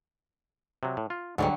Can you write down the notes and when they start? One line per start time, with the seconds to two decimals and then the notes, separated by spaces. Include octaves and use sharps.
0.83 C3 F#3
0.97 A2
1.10 F4
1.38 D2 G#2 D3 F#3 G3